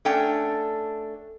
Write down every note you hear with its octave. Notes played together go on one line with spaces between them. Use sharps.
A3 C#4 D4 G5